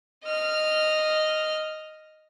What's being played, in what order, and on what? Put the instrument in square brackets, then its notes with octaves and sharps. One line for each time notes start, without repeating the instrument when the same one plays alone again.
[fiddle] D#5 F6